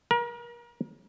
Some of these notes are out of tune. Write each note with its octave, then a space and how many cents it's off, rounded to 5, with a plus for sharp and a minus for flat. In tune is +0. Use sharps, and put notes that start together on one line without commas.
A#4 +35